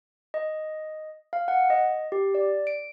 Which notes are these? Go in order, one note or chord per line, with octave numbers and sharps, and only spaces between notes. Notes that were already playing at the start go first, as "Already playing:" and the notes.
D#5
F5
F#5
D#5
G4
D5
D7